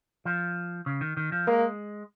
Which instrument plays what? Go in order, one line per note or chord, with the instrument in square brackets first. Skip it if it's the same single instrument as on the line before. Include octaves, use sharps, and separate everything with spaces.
[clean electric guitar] F3
C#3
D#3
D#3
F3
[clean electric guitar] G#3 [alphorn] A#3